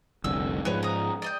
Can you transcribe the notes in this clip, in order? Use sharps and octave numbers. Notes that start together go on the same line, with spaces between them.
F1 C2 D3 E6
G#2 F3 B4 C#5
A#5 D#6
D5 D#5 G5